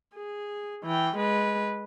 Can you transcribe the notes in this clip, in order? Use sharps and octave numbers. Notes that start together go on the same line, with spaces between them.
G#4
E3 G5
G#3 B4